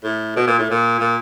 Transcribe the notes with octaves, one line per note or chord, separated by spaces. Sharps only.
A2
B2
A#2
A2
A#2
A#2